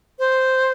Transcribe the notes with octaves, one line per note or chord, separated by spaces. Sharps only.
C5